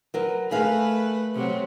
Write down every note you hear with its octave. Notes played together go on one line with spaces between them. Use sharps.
F#3 A#4 B4
A3 G#4 A#4 B4 F5
C3 F#3